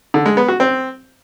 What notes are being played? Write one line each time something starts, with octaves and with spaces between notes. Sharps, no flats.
D3
G#3
B3
F#4
C4